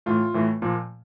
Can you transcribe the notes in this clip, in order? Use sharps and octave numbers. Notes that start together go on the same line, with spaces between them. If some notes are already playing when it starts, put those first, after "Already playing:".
A2 E3 A3 F4
A2 E3 A3
A#2 F3 A#3